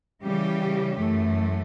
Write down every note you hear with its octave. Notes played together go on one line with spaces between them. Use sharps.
C#3 E3 G3 C#4 G4
F#2 E3 A3